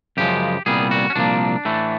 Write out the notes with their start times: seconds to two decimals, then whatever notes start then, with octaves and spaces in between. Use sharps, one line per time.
0.17 F#2 C#3 F3 G#3 G4
0.66 C2 A#2 G3 B3 G#4
0.91 F#4
1.10 C#4
1.15 C2 A#2 F3 A#3 D4
1.65 A2 E3 A3